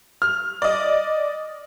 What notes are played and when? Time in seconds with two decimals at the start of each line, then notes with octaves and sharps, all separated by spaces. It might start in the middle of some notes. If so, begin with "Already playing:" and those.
0.22 F6
0.62 D5 D#5